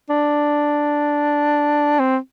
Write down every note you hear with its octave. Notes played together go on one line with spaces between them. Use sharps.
D4
C4